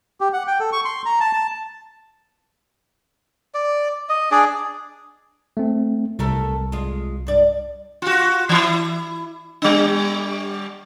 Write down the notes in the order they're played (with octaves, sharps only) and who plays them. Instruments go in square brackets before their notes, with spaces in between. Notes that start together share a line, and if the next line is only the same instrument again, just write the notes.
[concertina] G4
F#5
G5
A4
C#6
C6
A#5
A5
A5
[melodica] D5
D#5
D4 G#4 D5
[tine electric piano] A3 C4
[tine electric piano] C2 [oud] A3 A4 A#4
[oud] G#3 F4
G2 D5
[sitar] F4 F#4
E3 E4
G3 D4